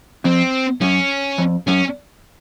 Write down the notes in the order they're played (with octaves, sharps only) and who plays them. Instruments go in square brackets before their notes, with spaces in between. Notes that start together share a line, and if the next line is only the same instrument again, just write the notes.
[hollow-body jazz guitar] F2 [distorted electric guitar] C4
[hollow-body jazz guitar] F#2 [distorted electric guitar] C#4
[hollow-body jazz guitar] F2
[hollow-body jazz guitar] F#2 [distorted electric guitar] C#4